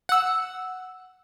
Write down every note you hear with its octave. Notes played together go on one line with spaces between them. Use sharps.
F#5 E6